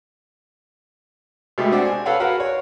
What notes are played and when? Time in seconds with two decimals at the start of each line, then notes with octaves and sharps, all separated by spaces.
1.58 B2 G#3 A3 G4
1.72 C4 D4 F#4
1.85 G#5
2.06 A4 B4 C#5 F5 F#5
2.20 F#4 A#4 B4 F5
2.40 C#5